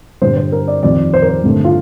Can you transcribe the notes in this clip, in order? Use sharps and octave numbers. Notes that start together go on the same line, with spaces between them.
G2 D3 G3 C5
C5
A#4
D5
F2 D#3 G3 D5
C5
A#4
C5
G2 D3 A3
F4